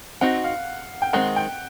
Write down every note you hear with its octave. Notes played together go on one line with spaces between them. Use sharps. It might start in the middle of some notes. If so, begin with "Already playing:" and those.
C4 D#4 F#4 F#5
F5
G5
D#3 G#3 C4 F#5
G5